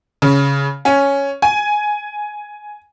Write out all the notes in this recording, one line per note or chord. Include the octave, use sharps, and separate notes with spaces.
C#3
C#4
G#5